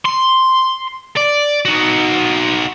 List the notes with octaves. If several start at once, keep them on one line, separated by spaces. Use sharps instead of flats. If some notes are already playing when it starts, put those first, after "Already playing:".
C6
D5
D#4 F#4